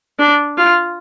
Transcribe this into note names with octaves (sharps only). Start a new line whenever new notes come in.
D4
F4